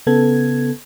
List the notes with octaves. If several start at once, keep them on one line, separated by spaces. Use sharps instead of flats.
C#3 B3 A4 G#6